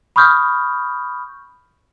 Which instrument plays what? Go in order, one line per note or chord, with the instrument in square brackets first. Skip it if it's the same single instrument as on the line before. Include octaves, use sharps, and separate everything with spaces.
[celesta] B5 C#6 D#6 F6 G6